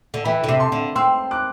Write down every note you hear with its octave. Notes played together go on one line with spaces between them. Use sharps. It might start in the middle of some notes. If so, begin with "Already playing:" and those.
D3
E3 G5 B5
D3
C3
A5 C6
D3
C4 C6 E6
D6 F#6